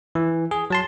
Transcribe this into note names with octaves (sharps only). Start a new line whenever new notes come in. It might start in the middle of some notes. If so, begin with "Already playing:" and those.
E3
G#4
F#3 A5 C6